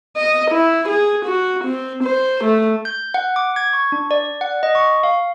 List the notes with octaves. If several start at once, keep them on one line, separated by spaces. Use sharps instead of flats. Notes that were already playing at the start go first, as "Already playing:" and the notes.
D#5
E4
G#4
F#4
C4
C5
A3
G6
F#5
D6
G#6
C#6
D4
D5
F#5
D#5
C#6
F5